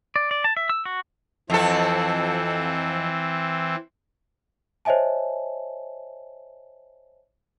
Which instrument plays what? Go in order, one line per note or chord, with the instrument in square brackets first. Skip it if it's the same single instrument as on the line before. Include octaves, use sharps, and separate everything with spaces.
[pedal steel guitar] D5
D5
A5
E5
E6
F#4
[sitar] F2 A4 [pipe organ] E3 C4
[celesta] C5 C#5 D#5 E5 G#5 A5